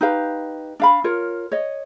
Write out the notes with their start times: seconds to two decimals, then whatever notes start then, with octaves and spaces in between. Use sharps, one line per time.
0.01 D#4 G4 B4 F5
0.80 D4 F5 B5
1.04 F4 A#4 C#5
1.52 C#5 D#5